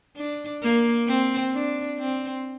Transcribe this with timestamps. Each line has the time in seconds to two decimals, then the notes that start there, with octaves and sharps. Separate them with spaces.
0.17 D4
0.63 A#3
1.08 C4
1.53 D4
1.98 C4